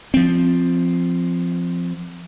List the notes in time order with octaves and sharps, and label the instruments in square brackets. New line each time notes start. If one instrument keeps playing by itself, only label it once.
[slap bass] F3 C4